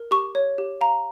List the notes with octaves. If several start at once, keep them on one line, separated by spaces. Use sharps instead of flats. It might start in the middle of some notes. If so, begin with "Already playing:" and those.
Already playing: A#4
G4 C#6
C#5
G4
F5 A#5